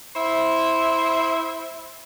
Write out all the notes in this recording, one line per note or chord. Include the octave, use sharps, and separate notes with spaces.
E4 C5 E5